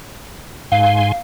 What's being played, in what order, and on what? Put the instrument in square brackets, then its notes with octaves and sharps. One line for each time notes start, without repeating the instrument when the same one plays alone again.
[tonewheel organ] G#2 G#5 C6 [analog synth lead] F5